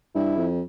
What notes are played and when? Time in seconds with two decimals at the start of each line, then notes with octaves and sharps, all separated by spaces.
0.15 G2 E4
0.37 F2